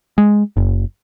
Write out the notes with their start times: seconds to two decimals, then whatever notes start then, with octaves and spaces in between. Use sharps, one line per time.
0.18 G#3
0.57 F#1